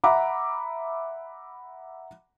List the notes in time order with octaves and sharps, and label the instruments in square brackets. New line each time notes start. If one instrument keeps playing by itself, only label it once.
[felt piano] E5 F#5 A#5 B5 D6